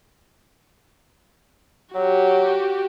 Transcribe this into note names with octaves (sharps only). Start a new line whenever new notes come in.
F#3 F#4 G4